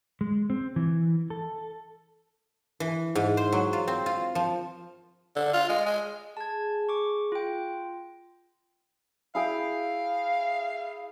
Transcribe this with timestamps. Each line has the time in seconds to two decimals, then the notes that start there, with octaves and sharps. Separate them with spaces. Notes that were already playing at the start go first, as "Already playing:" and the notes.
0.21 G#3
0.50 C4
0.76 E3
1.30 A4
2.80 E3
3.15 G#2
3.37 C5
3.52 F#3
3.73 F4
3.88 C4
4.06 F4
4.35 F3
5.36 D3
5.54 F4
5.69 G#3
5.86 G#3
6.37 G#4 A5 G#6
6.89 C#6 D6
7.32 F4 G5
9.35 E4 G#4 F5 G5